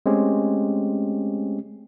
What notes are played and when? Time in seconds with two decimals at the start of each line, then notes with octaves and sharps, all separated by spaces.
0.06 G#3 A3 C4 C#4 G4